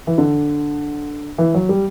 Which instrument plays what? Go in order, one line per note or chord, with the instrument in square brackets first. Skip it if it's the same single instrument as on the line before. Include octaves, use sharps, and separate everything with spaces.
[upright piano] E3
D3
E3
F#3
G3